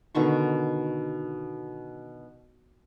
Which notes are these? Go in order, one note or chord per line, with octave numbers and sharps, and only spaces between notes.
B2 D3 D#3 C#6